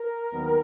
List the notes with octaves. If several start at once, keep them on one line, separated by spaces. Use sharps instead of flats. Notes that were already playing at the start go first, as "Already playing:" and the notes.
Already playing: A#4
D#2 D#3 F#3 B3